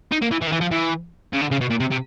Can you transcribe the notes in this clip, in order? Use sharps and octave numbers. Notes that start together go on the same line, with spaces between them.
D#4
A#3
E3
E3
D#3
E3
F3
E3
C#3
D3
C#3
B2
A#2
C3
C3